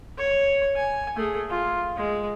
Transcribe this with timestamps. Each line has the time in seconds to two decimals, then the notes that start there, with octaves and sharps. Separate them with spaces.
0.18 C#5
0.76 G#5
1.16 A3 G#4
1.50 F4
1.97 G#3